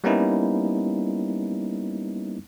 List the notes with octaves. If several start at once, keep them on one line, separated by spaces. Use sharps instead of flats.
G3 A#3 B3 C#4 D#4 E4